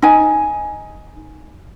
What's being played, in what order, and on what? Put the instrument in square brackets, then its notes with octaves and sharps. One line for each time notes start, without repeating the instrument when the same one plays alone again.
[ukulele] D#4 G#5